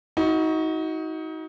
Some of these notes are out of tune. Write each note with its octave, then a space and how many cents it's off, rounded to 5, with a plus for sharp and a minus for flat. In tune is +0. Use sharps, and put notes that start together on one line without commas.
D#4 +30 F#4 +0